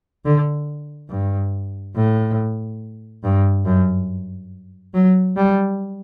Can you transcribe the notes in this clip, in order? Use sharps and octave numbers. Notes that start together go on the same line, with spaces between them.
D3
G2
A2
G2
F#2
F#3
G3